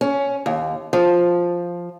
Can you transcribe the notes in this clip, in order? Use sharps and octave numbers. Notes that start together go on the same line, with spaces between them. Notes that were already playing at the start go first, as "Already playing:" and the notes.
C#4
D#2
F3